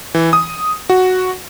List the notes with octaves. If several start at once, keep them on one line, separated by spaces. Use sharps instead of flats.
E3
D#6
F#4